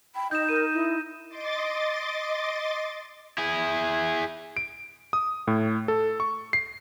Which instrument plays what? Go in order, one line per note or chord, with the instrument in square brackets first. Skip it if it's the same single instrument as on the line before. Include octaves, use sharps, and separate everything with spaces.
[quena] G5 [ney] B5
[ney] D#4 [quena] D#5 [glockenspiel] G6 E7
[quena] A#4 [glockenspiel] D#7
[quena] E4
[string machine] D#5 C6 D6 A6
[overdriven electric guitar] E4 G#4
[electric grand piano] D7
D#6
A2
A4
C#6
C7